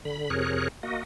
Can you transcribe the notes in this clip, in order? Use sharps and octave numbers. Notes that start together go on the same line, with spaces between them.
D3 B5
F2 C3 G#4 A#4 C#5 F#6
A#3 F#4 D#5